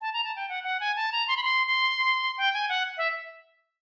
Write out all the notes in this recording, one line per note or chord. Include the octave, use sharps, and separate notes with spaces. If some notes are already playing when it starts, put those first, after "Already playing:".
A5
A#5
A5
G5
F#5
F#5
G#5
A5
A#5
C6
B5
C6
C6
G5
G#5
F#5
E5